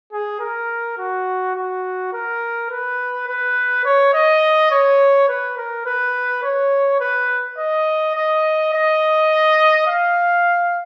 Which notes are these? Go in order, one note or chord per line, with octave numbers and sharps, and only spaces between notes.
G#4
A#4
F#4
F#4
A#4
B4
B4
C#5
D#5
C#5
B4
A#4
B4
C#5
B4
D#5
D#5
D#5
F5